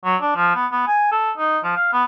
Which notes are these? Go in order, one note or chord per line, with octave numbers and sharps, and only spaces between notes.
F#3
D4
F3
B3
B3
G#5
A4
D#4
F3
F5
B3